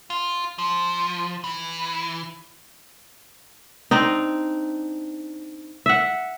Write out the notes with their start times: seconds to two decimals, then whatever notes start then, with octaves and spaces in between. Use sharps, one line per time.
0.10 F4
0.58 F3
1.44 E3
3.91 C4 D4 D#4
5.86 E5 F#5